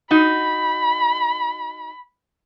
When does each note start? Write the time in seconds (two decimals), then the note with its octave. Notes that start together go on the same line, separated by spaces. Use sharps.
0.11 D#4 F#4 B5